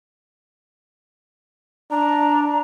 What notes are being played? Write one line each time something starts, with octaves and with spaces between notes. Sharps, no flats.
D4 A#5